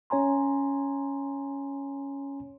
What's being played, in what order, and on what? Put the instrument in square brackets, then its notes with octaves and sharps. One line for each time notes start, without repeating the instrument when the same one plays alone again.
[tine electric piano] C#4 C#5 G#5 A#5 C6